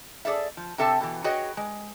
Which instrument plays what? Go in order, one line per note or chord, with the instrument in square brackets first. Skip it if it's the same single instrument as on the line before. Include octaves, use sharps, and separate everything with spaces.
[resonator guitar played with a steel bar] G#4 A4 D5 E5
F3
C3 C4 A4 E5 A5
B2 E3
F#4 G#4 B4 C#5 D#5 G5
G#3